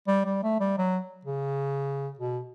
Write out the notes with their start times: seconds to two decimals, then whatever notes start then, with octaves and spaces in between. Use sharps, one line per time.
0.07 G3
0.25 G3
0.43 A3
0.60 G3
0.78 F#3
1.25 C#3
2.19 B2